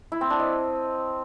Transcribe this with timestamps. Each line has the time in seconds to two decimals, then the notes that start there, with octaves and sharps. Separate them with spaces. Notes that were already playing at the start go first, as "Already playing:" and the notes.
0.12 E4
0.21 C4
0.30 D4
0.40 D#5